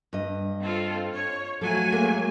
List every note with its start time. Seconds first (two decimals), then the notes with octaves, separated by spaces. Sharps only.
0.13 G2 D#5
0.60 C4 F4 A4
1.14 C#5
1.61 F3 F#3 A3 A4 G#5
1.92 G#3 A#3 A4